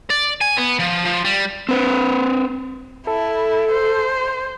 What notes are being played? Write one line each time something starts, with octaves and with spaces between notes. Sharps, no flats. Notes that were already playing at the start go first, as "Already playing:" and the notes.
D5
G#5
B3
F3
F3
G3
C4 B4 C5
E4 A4
C5